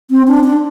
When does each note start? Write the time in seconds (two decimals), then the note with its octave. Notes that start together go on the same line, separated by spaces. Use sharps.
0.11 C4
0.28 D4
0.44 D4